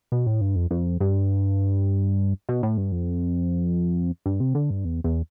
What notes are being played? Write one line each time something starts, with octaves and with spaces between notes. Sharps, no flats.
B2
A2
G2
F2
F2
G2
B2
A2
G2
F2
G2
C3
D3
G2
E2
E2